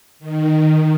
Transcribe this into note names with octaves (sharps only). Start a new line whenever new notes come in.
D#3